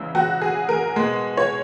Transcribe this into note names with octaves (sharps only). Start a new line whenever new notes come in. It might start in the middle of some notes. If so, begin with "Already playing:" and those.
Already playing: E2 C#3 G#3 E4
F#4
G#4
A#4
B2 G#3
C#5